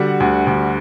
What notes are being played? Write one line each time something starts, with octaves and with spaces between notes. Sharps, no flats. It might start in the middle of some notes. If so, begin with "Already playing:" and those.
Already playing: D3 G3 F#4 F#5
D2
D2